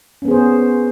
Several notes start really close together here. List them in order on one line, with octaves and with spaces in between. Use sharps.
C#4 B3 G#4 C5